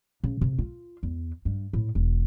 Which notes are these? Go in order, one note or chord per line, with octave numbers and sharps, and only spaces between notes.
C#3
C3
F4
E2
G2
A2
E1